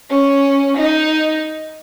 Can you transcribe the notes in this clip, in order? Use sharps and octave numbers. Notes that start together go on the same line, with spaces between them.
C#4
D#4